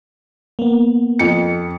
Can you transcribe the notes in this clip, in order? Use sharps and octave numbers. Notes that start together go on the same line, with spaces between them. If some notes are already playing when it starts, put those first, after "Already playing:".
A#3 B3
F2 C#7